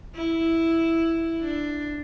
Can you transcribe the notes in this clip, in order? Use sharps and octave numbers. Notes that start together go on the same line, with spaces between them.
E4
D4